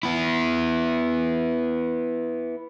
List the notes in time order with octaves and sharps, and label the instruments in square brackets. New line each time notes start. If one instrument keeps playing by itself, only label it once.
[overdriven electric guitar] B3 E4